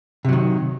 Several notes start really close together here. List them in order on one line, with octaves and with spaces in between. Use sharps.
C3 F#3 D#3